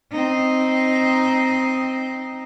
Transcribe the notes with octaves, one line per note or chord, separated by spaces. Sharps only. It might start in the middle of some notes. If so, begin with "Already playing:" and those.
C4 D#4